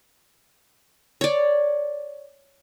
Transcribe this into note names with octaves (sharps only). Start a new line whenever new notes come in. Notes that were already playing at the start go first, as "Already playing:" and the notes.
C#5 D5